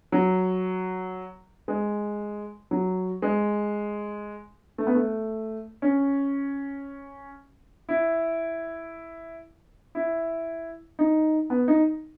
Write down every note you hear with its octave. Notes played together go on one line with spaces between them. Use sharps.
F#3
G#3
F#3
G#3
A3
B3
A3
C#4
E4
E4
D#4
B3
D#4